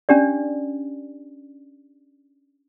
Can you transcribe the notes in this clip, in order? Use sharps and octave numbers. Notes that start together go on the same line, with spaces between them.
C#4 D4 G4 D5